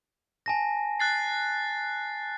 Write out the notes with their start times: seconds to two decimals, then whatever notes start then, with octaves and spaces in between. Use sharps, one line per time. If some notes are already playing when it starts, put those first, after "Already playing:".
0.46 G#5 A5 A#6
1.00 F#6 A6 C7